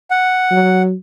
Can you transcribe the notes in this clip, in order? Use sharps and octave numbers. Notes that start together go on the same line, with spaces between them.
F#5
F#3